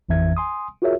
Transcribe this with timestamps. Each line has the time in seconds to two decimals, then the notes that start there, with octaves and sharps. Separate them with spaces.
0.09 A1 F2 E3 E5 G#6
0.37 G#5 C6 D#6
0.82 F4 F#4 G#4 A#4 C#5 E5